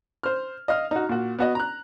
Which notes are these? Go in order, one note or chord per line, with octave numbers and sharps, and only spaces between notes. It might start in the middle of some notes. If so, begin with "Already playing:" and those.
C5 F6
D#5 F5 F6
D#4 F#4
A#2 F#4
B3 F#4 D#5
A#5 F#6